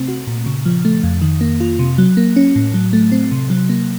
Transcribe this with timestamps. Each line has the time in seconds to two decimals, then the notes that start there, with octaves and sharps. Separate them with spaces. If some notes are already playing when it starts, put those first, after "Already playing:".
Already playing: C3 A3 C4
0.08 F#4
0.27 A#2
0.46 C#3
0.65 F3
0.85 A3
1.03 F2
1.22 D#3
1.41 A#3
1.61 F4
1.79 C3
1.98 F#3
2.17 A#3
2.36 C#4
2.56 A2
2.74 F#3
2.93 A3
3.12 C4
3.31 C3
3.50 F#3
3.69 A#3